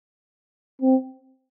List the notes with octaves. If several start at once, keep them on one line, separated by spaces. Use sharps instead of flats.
C4